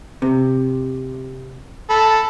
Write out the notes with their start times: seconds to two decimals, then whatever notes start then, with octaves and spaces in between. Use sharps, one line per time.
0.22 C3
1.90 A4 B5